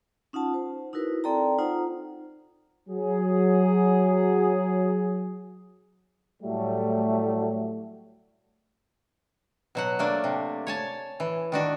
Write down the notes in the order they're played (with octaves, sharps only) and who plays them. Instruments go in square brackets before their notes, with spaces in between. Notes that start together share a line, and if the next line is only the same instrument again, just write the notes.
[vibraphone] C#4 D#4 F4 F#5 A5
C5
D#4 E4 F#4 A#4 B4
C4 A4 D5 G5 A5 A#5
D#4 F4 C5 F#5 A#5
[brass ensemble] F#3 G#4
A2 F#3 G3 A3
[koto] B2 F#3 F#5
A3 A#3 D4
C3
C#5 G#5 A5
E3
D#3 D4 F#4